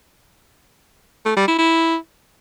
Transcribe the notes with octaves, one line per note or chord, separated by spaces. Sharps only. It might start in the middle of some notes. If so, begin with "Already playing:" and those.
A3
G3
E4
E4